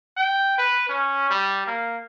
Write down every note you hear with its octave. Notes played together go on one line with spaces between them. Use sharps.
G5
B4
C#4
G3
A#3